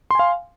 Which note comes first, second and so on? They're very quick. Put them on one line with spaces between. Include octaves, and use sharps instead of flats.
C6 G#5 F5